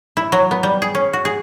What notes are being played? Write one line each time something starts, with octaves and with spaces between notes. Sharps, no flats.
E4
F#3
B3
G3
G#4
C#4
F#4
G#4